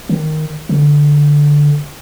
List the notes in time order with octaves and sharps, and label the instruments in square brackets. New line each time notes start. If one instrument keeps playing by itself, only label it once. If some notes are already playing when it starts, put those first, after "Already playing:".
[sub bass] D#3
D3